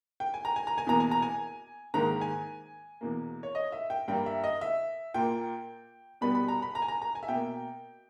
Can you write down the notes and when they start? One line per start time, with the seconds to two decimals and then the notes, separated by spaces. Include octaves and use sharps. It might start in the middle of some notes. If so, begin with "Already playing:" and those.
0.20 G5
0.34 G#5
0.45 A#5
0.56 G#5
0.67 A#5
0.78 G#5
0.87 E2 B2 A#3 A#5
1.00 G#5
1.11 A#5
1.22 G#5
1.94 G#2 D#3 A#3 A#5
2.21 G#5
3.01 E2 B2 A#3
3.43 C#5
3.55 D#5
3.72 E5
3.90 G5
4.08 G2 G3 A#3 G5
4.26 E5
4.44 D#5
4.61 E5
5.14 A#2 A#3 G5
6.21 B2 G3 B3 B5
6.35 B5
6.48 A#5
6.62 B5
6.75 A#5
6.82 G#5
6.88 A#5
7.02 A#5
7.15 G#5
7.23 E5
7.28 B2 A#3 G5